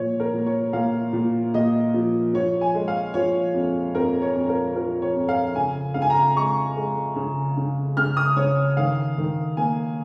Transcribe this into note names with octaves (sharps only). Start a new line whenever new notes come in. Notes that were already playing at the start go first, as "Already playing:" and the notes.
Already playing: A#2 F3 C#5
A#4
A#2
C#5
A#2 F5
A#2
A#2 D#5
F3
F3 C#5
G#5
G#3
F5
F3 C#5
F2
F2 A#4
C#5
F2
A#4
F3 A#4
C#5
F2
F5
C#3 G#5
C#3 F5
G#5
A#5
G#3 C#6
G#3
C#3
C#3
C#3 F6
D#6
C#3 C#5
D#3 F5
D#3
A#3 G#5